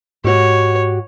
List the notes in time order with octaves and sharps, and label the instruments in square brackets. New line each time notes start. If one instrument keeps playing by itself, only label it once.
[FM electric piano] G#2 [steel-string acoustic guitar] F#4 G4 [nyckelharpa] C#5